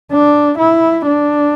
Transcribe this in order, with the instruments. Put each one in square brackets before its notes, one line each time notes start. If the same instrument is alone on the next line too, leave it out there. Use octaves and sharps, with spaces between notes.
[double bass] D4
E4
D4